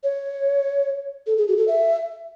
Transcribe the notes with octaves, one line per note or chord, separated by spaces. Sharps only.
C#5
A4
G#4
F#4
A4
E5